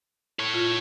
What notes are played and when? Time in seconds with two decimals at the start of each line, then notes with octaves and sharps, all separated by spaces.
0.39 A4 C#5
0.54 F4